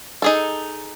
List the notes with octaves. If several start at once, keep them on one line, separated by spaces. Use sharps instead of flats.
D#4 G#4 A4